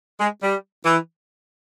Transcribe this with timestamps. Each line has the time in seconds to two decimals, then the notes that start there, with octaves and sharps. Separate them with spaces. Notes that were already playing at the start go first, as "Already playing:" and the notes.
0.20 G#3
0.42 G3
0.84 E3